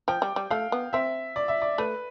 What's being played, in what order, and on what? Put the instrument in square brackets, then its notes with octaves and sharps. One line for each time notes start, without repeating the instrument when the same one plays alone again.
[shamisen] F3 [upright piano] G5
[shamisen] G3
G3
[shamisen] A3 [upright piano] F5
[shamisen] B3
[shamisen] C4 [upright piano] E5
[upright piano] D5
E5
D5
[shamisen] A3 [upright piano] B4